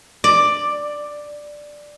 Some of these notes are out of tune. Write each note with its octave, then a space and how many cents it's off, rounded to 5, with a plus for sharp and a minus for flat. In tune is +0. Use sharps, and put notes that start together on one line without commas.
D5 +5